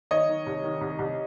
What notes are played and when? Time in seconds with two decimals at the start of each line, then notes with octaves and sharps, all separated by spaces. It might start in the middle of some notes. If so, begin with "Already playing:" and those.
0.11 D#3 C#5 D#5
0.29 D#3
0.46 C2
0.64 D#3
0.81 C2
0.99 C2